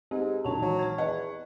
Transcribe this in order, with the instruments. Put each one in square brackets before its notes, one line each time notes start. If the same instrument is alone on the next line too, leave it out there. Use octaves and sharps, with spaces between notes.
[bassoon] G#2 [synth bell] C4 G4
[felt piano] A#1 D#3 [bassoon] F#3 [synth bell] A5 F7
[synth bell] E3 [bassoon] F#3
[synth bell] C#6 G#6
[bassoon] E2 [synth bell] D#5 [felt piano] F#5